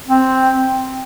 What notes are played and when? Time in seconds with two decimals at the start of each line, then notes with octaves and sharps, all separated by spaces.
0.08 C4